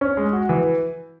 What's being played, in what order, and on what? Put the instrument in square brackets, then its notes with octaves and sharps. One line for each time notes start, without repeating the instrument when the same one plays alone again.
[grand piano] C#4
G#3
F#4
E3